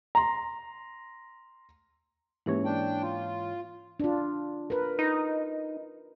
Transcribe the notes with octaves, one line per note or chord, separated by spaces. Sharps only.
A#5 C6
G#2 E3 A#3 C#4 G4 C#5
D4 G5
F4
D4 F4
A#4 B4
D#4